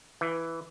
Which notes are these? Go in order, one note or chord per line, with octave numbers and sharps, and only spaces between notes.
E3